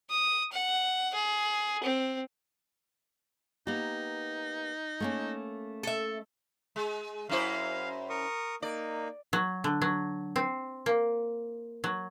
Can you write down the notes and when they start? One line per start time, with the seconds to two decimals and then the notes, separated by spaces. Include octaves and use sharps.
0.10 D#6
0.52 F#5
1.14 G#4
1.83 C4
3.67 A#3 B3 D#4 G4
5.00 A3 A#3 C#4
5.83 A4 E5
6.76 G#3
7.29 F#2 E4 C5 F5
8.10 A#4 C#6 D#6
8.62 A#3 D#4 D5
9.33 F#3
9.64 D3
9.82 F#3
10.36 C4
10.86 A#3
11.84 F#3